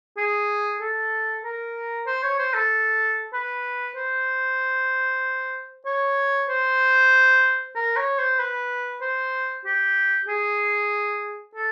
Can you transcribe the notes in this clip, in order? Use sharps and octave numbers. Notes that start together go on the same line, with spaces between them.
G#4
A4
A#4
C5
C#5
C5
A4
B4
C5
C#5
C5
A#4
C#5
C5
B4
C5
G4
G#4
A4